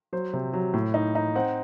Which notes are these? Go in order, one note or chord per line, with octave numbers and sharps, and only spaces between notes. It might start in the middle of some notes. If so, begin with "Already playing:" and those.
F#3 C5
C3
F#3
A2
D#4
D#4
C4 F#5